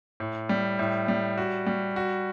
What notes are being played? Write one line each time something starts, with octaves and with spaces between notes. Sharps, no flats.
A2
G3
A2
G3
F#4
G3
F#4